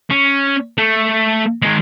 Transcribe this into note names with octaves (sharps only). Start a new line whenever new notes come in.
C#4
A3
D#3 G#3